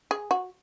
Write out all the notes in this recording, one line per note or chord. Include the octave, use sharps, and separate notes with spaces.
G#4
F#4